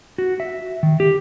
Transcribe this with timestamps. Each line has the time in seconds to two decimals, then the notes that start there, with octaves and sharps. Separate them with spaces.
0.18 F#4
0.40 E5
0.83 D#3
1.00 G4